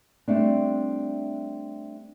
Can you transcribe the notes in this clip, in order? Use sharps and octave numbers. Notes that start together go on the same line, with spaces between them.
G3 A3 C4 D4